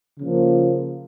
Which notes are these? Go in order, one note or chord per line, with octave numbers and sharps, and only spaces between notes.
C#3 F3 A#3